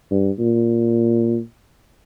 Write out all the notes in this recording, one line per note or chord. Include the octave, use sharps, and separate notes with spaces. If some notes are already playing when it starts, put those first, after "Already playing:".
G2
A#2